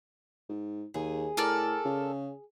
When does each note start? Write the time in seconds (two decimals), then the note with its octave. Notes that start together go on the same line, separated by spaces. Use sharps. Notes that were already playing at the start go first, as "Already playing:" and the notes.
0.49 G#2
0.94 D#2 G#4
1.37 A2 A4 A#4 D5
1.85 C#3